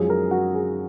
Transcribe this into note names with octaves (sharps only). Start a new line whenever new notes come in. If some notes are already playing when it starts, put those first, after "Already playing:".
Already playing: F#2 F3 G#3 G#4
A#4
F#4
G#4